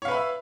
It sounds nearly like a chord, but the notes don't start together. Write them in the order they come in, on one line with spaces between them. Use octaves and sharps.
C#5 F5 B4 B5 E5